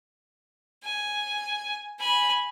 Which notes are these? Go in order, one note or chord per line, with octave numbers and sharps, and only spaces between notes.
G#5
G#5 B5